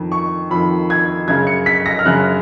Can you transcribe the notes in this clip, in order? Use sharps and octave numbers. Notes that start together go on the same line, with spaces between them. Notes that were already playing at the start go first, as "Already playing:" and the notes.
Already playing: F2 D#3
C#6
F2 D#3 B5
G#6
F#2 C#3 G#6
C#7
B6
A#6
F6
F#2 C#3 F#6